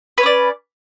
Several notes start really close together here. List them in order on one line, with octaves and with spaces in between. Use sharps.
B4 C#5 C#4 D5